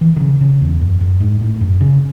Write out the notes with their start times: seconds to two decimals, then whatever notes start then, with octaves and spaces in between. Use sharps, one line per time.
0.01 E3
0.16 D#3
0.20 C#3
0.41 C#3
0.61 E2
0.81 F#2
1.01 F#2
1.20 G#2
1.41 A2
1.61 F#2
1.81 C#3